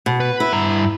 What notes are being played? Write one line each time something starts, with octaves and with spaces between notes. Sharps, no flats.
B2
B4
E4
G2 A#5